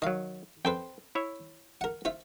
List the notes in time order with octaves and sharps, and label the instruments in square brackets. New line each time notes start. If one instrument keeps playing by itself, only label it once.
[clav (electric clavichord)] D#3 F#3 [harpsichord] D#5 F5
[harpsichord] F2 A4 B4 [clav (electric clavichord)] C5 G5
[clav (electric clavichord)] E4 C#5 E5
[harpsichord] A#4 F#5
F4 C5 E5